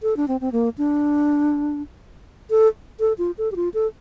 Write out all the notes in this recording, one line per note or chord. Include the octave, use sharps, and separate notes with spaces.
A4
D4
C4
C4
A#3
D4
A4
A4
F4
A4
G4
F4
A4